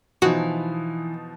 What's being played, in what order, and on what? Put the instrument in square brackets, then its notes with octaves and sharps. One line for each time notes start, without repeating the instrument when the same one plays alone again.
[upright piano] B2 F3 D#4 [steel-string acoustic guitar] E3 [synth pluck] F#4